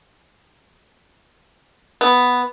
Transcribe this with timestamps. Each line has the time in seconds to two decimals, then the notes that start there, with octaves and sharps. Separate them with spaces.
2.01 B3